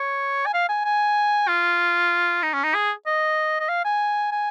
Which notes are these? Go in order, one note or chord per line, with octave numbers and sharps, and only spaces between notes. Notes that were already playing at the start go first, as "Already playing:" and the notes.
Already playing: C#5
G#5
F5
G#5
G#5
F4
D#4
C#4
D#4
G#4
D#5
D#5
F5
G#5
G#5